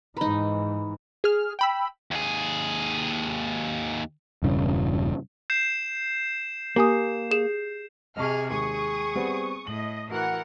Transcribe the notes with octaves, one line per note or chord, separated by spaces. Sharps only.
G#2 E3 D#4 B4 A#5 B5
G#4 F6
G5 B5 E6
D#2 G#4
E1 G2 C#3
G6 C7 E7
A#3 G4 G#5 D#6
G#4 E7
C3 G#4 D#5 A5 C#6 F6
D#2 G#3 G#4 C#6 D#6
G3 B3 C4
A2 D#5 F#7
E3 F#4 A#4 F#5